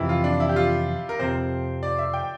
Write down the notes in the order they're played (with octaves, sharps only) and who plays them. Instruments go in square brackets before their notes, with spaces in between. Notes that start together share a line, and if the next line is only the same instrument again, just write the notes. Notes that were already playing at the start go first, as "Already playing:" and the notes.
Already playing: [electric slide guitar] F2 C3 E3 [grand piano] E4
[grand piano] F4
D4
E4
G4
F4
A#4
[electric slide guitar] F2 C3 F3 C4 [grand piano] C5
[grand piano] D5
E5
G5